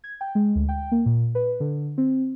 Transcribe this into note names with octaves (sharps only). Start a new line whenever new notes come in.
G#6
G5
G#3
D2
G5
A#3
A#2
B4
D3
C4